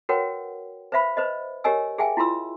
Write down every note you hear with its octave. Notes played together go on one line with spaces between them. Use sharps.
F#4 A#4 B4 C#5 F#5 G5
B4 C5 E5 F5 B5
B4 C5 D#5
G4 A#4 C#5 D#5 G#5 E6
G#4 E5 G5 G#5
E4 F4 A#5 C6 E6